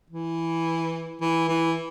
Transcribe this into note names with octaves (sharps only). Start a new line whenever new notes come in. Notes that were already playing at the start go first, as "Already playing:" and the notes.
E3
E3
E3